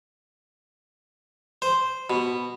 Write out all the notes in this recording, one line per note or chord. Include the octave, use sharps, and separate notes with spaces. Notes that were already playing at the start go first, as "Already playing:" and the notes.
C5
B2